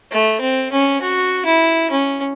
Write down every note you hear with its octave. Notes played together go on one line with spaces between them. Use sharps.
A3
C4
C#4
F#4
E4
C#4